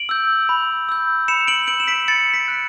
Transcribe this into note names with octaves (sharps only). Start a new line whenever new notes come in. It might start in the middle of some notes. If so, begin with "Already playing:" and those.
Already playing: D7 F#7
E6 G6
B5
E6 G6
B5 C#7 E7
D7 F#7
E6 G6 D7 F#7
E7
B6 D7
B5 A6 C#7
B6 D7
F#6 B6